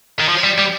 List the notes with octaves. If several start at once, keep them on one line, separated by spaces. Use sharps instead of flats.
D#3
F3
G3
G3